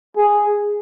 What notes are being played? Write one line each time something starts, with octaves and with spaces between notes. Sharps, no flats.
G#4